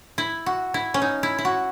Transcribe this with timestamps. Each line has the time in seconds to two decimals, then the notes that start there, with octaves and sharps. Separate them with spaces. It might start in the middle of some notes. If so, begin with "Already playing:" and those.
0.18 E4
0.46 F#4
0.74 E4
0.94 C#4
1.02 D#4
1.23 E4
1.38 E4
1.45 F#4